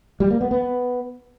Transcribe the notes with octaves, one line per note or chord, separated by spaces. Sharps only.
G3
A#3
B3
B3